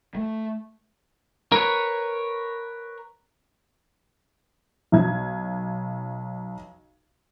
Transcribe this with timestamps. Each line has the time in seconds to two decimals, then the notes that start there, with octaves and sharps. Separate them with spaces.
0.15 A3
1.52 A#4 B4 C#5
4.92 B1 G#6